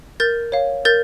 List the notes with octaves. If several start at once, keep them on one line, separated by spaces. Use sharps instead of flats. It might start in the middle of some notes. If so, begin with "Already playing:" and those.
A#4 G6 A6
C#5 F5
A#4 G6 A6